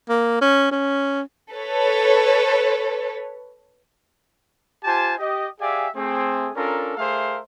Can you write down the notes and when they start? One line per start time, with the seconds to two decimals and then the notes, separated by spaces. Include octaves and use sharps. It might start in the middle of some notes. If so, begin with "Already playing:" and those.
0.09 A#3
0.41 C#4
0.71 C#4
1.52 A4 B4 C#5
4.84 F4 G4 C5 G#5 A5
5.19 G4 D#5
5.60 G4 G#4 D5 E5 F5 G#5
5.96 A3 C4 G#4
6.55 C#4 D4 F4 A4 A#4
6.97 A3 G#4 A#4 C5 E5 F5